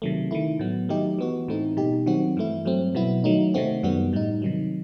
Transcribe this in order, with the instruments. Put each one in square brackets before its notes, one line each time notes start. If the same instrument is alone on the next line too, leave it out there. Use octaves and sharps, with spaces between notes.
[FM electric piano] C3 D#3 F#3 A3
D#3 A3 E4
A2 F#3 B3
D#3 F#3 A3 D#4 G4
E3 B3 F#4
A2 E3 A3 C4 D#4
B2 G3 D#4 G4
D#3 F#3 C4 F#4
G2 E3 A3 E4
G2 F#3 A3 C4
B2 F#3 B3 E4
D#3 F#3 A3 D#4
C3 D#3 A3 C4 F#4
F#2 D#3 G3 B3 F#4
A2 G3 D#4
C3 D#3 F#3